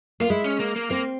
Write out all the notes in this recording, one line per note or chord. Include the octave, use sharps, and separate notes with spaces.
A#3 F4
G#3 E4
C#4
A#3
A#3
A#3 C4